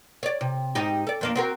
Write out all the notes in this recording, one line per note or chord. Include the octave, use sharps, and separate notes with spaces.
C#5 D5
C3
G#2 D#4 G4
A4 D5
F2 A#3 D4
C4 F#4 A#4